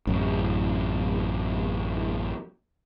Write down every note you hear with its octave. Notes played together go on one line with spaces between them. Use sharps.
A1 F#2